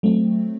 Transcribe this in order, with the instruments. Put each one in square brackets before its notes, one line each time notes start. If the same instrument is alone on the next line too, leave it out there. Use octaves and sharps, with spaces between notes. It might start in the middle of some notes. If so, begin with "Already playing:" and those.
[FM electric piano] F#3 A3 C4